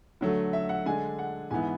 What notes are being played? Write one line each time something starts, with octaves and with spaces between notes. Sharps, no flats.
D3 F#3 A3
E5
F#5
D3 G#3 D4 G#5
F#5
G#2 E3 B3 E4 G#5